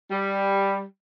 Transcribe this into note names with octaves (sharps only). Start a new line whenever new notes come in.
G3